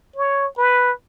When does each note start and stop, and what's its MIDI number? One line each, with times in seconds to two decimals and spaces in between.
0.16 0.47 73
0.58 0.92 71